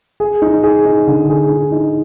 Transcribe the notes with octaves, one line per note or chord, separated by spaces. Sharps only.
G#4
D#4
G#4
D#4
D3
G#4
D#4
D#4